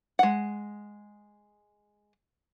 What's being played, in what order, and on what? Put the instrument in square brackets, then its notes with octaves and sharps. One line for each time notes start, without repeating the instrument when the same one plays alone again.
[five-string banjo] G#3 F#5